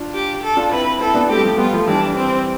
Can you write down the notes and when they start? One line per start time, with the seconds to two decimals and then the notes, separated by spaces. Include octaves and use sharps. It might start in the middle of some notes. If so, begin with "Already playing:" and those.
Already playing: D4 F4
0.14 G4
0.43 A4
0.57 D4 F4
0.72 C4 E4 B4
1.00 C4 E4 A4
1.14 B3 D4
1.29 A3 C4 G4
1.37 G3
1.44 F3 A3
1.58 G3 B3 F4
1.73 F3 A3
1.87 E3 G3 D4
2.16 C4